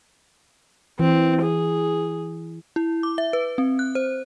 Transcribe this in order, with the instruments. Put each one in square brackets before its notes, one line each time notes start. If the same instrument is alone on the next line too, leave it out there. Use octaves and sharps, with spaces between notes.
[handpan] E3 [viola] C4
[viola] G#4
[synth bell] E4
D6
E5
B4
C4
F#6
C5